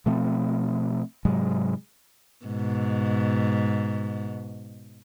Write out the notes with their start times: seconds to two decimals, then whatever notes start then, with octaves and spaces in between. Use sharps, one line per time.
0.06 B2 F3 A3 C4
1.25 G#2 C3 F#3 G#3
2.46 G#2 B2